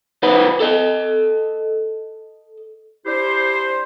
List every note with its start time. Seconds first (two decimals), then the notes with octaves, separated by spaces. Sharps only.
0.22 C2 D#3 B4 C5 F#5 B5
0.60 A4 D#5
3.06 D4 E4 G4 C5